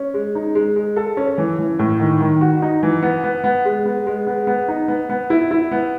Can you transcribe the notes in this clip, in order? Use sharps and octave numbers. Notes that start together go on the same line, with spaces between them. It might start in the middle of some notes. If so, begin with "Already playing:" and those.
Already playing: C#4
G#3
D#4
G#3
G#3
A4
C#4
E3
E3
A2
D#3
D#3
F#4
D#4
E3
B3
B3
B3
G#3
B3
G#3
B3
B3
D#4
B3
B3
E4
E4
B3